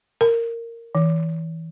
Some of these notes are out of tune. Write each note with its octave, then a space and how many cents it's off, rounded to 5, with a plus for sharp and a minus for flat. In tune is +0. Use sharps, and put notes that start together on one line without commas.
A#4 -15
E3 -20